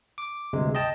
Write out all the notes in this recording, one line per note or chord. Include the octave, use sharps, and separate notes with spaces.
D6
D2 G2 C3 G#3
D#5 G5 A5